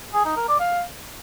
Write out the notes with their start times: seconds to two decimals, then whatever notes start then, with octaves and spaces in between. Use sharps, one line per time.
0.14 G#4
0.25 D#4
0.37 A#4
0.48 D5
0.60 F5